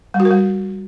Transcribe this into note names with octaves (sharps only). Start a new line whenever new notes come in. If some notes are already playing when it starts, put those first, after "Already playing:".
G3
F#4
A#4
G3